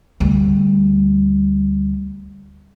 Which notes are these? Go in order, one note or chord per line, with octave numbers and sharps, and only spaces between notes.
D2 G3